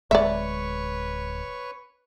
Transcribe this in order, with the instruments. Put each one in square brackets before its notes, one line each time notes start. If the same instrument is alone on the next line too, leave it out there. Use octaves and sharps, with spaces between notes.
[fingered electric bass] D1 G#3 [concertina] B4 C#5 C#6 [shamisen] D5 E5